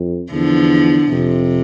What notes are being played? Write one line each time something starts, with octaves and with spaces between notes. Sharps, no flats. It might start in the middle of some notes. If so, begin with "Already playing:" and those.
Already playing: F2
E2 D3 F3
F2 C3